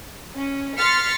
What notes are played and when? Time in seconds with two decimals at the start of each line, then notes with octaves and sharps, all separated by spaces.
0.35 C#4
0.78 C6 F6 A6 B6 C#7